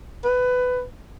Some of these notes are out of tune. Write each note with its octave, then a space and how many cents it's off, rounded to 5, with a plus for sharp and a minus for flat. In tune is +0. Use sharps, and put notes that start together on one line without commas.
B4 +15